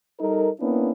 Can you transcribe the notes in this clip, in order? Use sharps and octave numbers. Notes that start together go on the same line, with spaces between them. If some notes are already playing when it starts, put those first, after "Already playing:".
G3 D#4 A4 A#4
A#3 B3 C#4 D4 E4